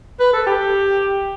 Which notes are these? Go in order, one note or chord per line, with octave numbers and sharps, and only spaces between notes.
B4
A4
G4